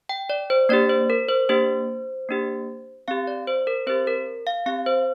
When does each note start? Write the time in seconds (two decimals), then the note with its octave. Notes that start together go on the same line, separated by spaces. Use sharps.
0.09 G5
0.30 D5
0.50 C5
0.69 A#3 D4 G4 D5
0.89 C5
1.10 A#4
1.29 C5
1.49 A#3 D4 G4 C5
2.29 A#3 D4 G4
3.08 C4 G4 F5
3.27 D5
3.47 C5
3.67 A#4
3.87 C4 G4 C5
4.07 A#4
4.47 F5
4.66 C4 G4 F5
4.86 C5